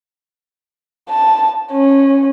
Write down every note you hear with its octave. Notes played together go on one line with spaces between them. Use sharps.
A5
C#4